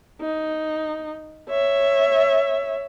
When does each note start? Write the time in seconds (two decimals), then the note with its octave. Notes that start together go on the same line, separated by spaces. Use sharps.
0.21 D#4
1.49 C#5 E5